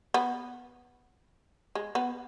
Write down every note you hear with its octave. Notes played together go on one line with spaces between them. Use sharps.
B3
G#3
B3